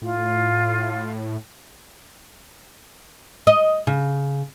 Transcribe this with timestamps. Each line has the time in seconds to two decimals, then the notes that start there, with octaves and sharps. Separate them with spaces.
0.02 A2 F4
3.47 D#5
3.87 C#3